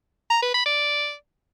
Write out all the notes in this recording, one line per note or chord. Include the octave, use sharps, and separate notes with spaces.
A#5
B4
B5
D5